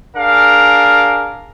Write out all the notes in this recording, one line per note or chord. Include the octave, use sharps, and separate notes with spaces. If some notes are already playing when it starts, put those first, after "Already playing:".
D4 G#4 A#4 F5